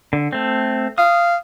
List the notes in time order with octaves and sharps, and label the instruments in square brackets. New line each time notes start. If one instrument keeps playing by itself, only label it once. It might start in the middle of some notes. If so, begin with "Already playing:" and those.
[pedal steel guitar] D3
A3 C4
[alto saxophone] F5 [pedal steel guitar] D#6